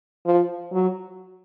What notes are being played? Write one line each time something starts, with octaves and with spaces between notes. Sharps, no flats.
F3
F#3